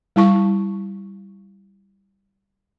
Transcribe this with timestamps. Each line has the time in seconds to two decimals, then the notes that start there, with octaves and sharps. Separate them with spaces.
0.16 G3 E4 A5 C#6